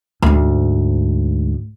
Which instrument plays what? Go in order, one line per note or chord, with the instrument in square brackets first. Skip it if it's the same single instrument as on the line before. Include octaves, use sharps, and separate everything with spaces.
[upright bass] D2 G#2